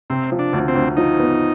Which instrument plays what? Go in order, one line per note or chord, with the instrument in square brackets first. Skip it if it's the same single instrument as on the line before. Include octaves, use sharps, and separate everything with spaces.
[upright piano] C3 [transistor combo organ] C4
[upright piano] F3
[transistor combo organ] D4
[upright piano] D2
[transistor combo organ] C4
[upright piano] D2
[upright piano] F3 [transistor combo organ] D#4
[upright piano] B3